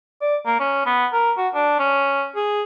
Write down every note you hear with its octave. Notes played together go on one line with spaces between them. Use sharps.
D5
A#3
C#4
B3
A#4
F#4
D4
C#4
G#4